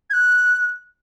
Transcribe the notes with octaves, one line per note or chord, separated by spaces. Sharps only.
G#6
F#6